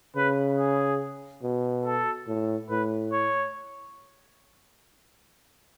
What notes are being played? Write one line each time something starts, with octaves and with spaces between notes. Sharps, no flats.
C#3 B4
G#4
B2
A4
A2
A2 B4
C#5